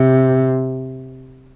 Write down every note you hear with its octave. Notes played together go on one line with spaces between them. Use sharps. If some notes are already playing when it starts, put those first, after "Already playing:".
Already playing: C3